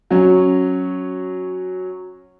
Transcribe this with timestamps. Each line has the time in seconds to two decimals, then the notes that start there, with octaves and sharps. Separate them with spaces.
0.11 F#3 C#4